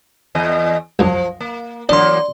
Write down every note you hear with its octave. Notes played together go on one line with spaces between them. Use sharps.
E2 D#5
C2 F#2 F3
A#3
E3 F#3 A#3 D4 D5 C6